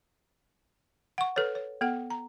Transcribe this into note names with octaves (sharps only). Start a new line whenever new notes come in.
F#5 C#6
A4 B4 C#5
C#5
B3 A4 F#5
A#5